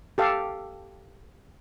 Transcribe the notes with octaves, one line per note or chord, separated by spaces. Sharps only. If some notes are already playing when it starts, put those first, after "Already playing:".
G4 A4 F5